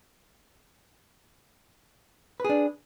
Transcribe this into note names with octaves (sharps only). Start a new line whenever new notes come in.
D4 G#4 B4